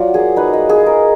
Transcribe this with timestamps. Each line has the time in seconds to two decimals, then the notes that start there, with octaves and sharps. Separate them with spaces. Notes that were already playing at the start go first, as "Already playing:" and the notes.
Already playing: F#3 F4 D5
0.14 A#3 G#4
0.36 D#4 B4
0.53 G#3 D#5
0.69 G#4
0.81 G#3
0.86 A#4